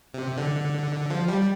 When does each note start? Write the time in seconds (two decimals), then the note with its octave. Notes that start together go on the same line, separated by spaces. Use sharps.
0.14 C3
0.38 D3
1.10 F3
1.28 G3